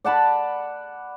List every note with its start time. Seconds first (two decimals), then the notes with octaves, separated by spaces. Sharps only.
0.05 D5 F#5 A5 B5